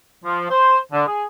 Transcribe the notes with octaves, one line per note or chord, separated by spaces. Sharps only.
F3
C5
D3
G#4